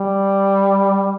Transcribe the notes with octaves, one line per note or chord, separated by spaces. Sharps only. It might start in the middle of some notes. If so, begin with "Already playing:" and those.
Already playing: G3